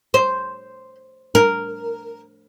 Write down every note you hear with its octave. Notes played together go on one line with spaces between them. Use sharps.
C5
A#4